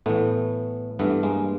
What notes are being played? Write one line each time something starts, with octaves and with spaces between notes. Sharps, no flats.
A2 E3 A3 B3
G2 E3 A3 B3
G#3 A#3